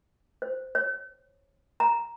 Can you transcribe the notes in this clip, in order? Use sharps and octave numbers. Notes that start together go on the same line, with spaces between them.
C5
C#5
A#5